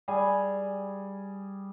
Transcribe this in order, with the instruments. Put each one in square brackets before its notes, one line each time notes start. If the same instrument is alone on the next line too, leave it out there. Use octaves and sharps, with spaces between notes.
[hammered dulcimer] G3 G#4 G#5